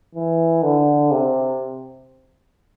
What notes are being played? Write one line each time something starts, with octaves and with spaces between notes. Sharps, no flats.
E3
D3
C3